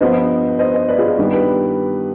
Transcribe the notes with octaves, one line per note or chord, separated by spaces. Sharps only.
G2 F3 B3 C5 D#5
C5 D#5
C5 D#5
B4 D5
F4 G#4
G2 D#3 G3 B3 G4
G4 B4